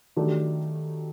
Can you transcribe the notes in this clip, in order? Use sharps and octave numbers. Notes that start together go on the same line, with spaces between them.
D#3 F#3 A3 D4 G4